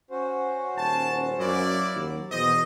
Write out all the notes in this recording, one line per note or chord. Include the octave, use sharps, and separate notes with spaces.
C#4 F#4 C5
D#1 A5
F#2 A#3 E4 D5
D#2 F#3
E2 B2 E3 C5 D#5